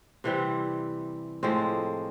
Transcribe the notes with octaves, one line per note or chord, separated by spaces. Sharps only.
C3 E3 G3 C4
A2 F3 G#3 C4